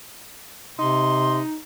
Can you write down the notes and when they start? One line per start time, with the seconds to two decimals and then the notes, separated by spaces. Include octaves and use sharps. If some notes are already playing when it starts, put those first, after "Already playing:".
0.79 C3 D#4 C6